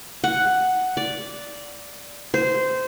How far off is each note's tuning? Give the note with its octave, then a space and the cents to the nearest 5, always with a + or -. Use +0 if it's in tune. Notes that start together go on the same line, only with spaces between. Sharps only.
F#5 +5
D5 -10
C5 -15